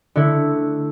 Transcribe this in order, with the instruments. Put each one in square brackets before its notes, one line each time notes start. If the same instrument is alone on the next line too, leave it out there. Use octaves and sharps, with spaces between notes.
[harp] D3 A3 E4